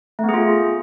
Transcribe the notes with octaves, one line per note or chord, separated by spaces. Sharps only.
A3 B3 F4 G#4